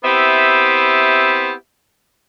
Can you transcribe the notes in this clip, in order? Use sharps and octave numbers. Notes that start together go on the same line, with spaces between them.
B3 C4 E4 G4 E5